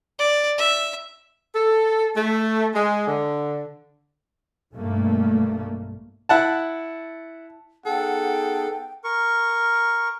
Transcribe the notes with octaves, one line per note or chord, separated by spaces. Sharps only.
D5
E5
A4
A3
G#3
D3
B1 G2 B2 A3 A#3
E4 F#5 A5
B3 D#4 G#4 A4 F#5 G5
A#4 C#6